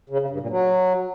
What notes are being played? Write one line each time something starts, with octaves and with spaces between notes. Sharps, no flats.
C#3
C#3
G2
A#2
F#3